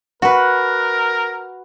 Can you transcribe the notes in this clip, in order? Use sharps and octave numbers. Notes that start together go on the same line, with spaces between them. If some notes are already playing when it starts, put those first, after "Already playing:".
F#4 A#4 B4